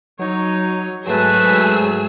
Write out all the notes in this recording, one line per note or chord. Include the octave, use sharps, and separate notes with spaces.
F#3 D#4 C#5
G#2 F#3 A3 G#4 B4 E6